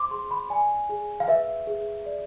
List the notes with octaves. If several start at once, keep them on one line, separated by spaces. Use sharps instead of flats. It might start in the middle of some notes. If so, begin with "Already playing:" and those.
Already playing: C5 C6 D6
G#4 C6
B5
D5 G#5
G#4
F5
B4 E5
G#4
D5